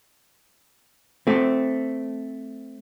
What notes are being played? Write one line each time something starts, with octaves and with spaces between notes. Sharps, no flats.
A3 C4